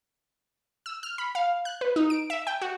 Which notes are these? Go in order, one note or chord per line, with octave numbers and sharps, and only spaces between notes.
E6
F6
B5
F5
F#6
B4
D#4
D7
E5
G5
F#4